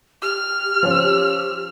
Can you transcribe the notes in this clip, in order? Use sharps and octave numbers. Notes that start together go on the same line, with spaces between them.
G4 F6
F3 C#4